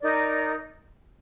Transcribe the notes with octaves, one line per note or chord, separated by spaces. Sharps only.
D#4 A#4 D5